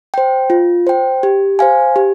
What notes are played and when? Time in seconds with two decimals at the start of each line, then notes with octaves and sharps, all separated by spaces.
0.14 C5 G5
0.50 F4
0.87 C5 G5
1.23 G4
1.59 C5 F5 G#5
1.96 G4